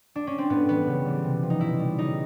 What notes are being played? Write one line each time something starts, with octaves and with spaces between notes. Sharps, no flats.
D4
C#4
C4
A2 B3
E3 G3 B3
C#3
E3 G3
C3
F3
D#4
B2 E4
G3
C#3 D#4